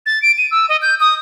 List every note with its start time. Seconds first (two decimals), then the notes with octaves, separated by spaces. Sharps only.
0.06 A6
0.22 D7
0.38 D#7
0.51 E6
0.69 D#5
0.82 G6
1.00 D#6